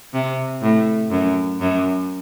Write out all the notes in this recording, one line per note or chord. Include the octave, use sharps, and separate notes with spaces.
C3
A2
F#2
F#2